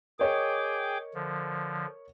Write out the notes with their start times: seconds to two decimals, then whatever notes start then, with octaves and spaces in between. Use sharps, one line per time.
0.19 G#4 A#4 C#5 D#5 G5 D6
1.14 D3 F3